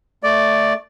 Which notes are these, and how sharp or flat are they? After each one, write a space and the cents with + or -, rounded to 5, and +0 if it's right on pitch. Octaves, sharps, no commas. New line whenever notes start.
A3 +0 D5 +0